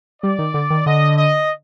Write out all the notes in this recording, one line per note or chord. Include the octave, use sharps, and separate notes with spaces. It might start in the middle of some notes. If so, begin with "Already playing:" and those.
G3 D5
D#3
D3
D#3
D3 D#5
D#5